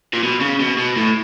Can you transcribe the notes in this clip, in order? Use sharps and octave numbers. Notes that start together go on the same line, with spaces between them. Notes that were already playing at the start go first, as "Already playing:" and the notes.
A#2
B2
C#3
B2
B2
A2